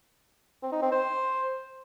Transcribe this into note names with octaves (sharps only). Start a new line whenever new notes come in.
C4
D#4
C4
C5